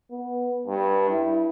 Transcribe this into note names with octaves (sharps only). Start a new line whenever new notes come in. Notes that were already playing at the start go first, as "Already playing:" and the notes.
B3
G2
E4